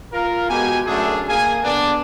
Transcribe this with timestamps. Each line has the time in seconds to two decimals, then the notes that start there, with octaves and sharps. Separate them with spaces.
0.13 F4 A#4
0.50 B2 G#3 G4 G#5
0.87 F#2 A3 D4 G#4 A4
1.29 A#3 G#4 G#5
1.64 D3 B3 D4